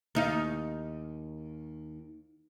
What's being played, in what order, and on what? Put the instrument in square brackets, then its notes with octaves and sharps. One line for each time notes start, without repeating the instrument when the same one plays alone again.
[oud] D#2 D#4 F5